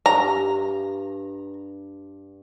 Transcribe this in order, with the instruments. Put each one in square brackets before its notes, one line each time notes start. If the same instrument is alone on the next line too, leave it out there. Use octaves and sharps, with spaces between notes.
[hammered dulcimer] G2 [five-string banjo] A#5